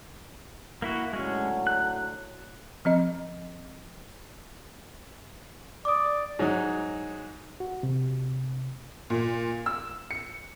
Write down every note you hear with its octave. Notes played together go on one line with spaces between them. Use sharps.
A#3 E4 F#4
A2 D3 F#3 G#3 C#4
F#6
F3 C4 D#5
D5 D6 D#6
G#2 F#3 D#4
F#4
C3
A#2
E6
C#7